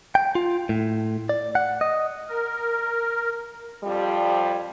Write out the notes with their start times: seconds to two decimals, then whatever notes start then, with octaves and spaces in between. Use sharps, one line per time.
0.15 G5
0.35 F4
0.69 A2
1.29 D5
1.55 F#5
1.81 D#5
2.28 A#4
3.83 F2 F3 G3